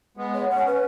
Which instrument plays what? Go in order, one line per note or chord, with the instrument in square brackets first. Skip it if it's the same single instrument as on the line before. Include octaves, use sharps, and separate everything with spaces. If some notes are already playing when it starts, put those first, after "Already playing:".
[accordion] G#3 B3
[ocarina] C#5
[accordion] C#4 [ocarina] F#5
[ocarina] B4